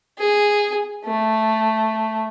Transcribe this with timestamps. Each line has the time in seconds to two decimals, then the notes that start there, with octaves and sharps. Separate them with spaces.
0.19 G#4
1.05 A3